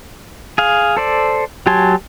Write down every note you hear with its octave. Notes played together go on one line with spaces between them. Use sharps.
G#4 F5
A4 C5 D5
F#3 G4 G#5 A5 C6